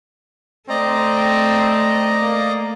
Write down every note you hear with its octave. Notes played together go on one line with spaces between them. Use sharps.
A3 C4 D5 D#5 A#5
A#3